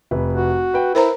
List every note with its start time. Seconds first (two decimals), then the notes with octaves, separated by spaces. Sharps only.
0.11 F1 B4
0.33 F#4
0.74 B4 G5
0.95 E4 A#4 C5 A#5